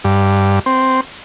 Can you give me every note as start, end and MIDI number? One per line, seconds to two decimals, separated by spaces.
0.04 0.59 43
0.66 1.01 60